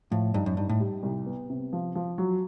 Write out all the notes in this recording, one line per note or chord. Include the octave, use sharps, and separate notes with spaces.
A2 F3
G2 D#4
F#2
G2 D#4
A2
G3
C2
B3
C3
F3
F3
F#3